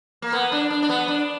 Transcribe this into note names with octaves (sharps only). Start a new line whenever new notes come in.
A#3
B3
D4
D4
D4
B3
D4